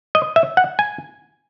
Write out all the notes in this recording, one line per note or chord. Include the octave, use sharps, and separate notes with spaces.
D#5
E5
F#5
G#5